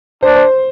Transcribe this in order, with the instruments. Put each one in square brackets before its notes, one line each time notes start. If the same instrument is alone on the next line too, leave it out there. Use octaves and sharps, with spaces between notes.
[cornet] D4 [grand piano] C5
[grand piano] C5